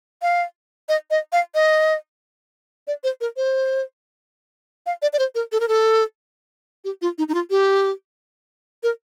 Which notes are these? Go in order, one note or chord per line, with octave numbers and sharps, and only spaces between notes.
F5
D#5
D#5
F5
D#5
D5
C5
A#4
C5
F5
D5
D5
C5
A#4
A4
A#4
A4
G4
F4
D#4
D#4
F4
G4
A#4